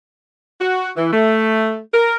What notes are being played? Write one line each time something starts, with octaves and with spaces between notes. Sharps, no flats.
F#4
E3
A3
A#4